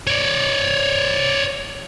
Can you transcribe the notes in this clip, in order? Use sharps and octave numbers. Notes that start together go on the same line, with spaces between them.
C#5 D5